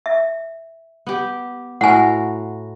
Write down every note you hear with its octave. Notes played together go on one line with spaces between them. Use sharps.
E5
B3 G4
A2 F#4 A#4 F#5 G#5